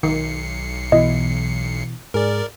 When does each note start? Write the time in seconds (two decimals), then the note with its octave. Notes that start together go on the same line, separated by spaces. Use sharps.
0.03 B1 D#3 C7 C#7
0.92 B2 E3 E4 D#5
2.14 G#2 G#4 A#4 D5